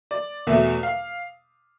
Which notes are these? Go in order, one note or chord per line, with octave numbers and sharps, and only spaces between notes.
D5
E2 B2 A3 E5
F5